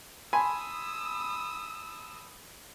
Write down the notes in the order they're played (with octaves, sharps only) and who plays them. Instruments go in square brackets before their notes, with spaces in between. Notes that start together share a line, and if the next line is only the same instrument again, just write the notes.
[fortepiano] G#5 [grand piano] A5 B5 C6 [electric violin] D#6 E6